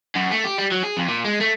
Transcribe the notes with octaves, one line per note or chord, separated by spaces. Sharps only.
F#2
A3
G4
G3
F#3
G#4
F2
A#2
G#3
A3